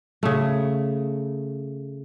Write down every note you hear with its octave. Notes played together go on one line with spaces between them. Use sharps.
C#3 A3